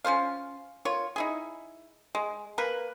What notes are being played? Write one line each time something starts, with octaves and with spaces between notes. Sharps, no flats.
C#4 F4 C5 F5
F4 A#4 C#5
D#4 E4 G#4
G#3
A#3 A#4 B4